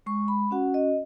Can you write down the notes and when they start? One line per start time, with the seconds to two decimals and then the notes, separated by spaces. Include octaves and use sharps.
0.06 G#3 C#6
0.28 B5
0.51 C#4 F#4 F#5
0.74 D#5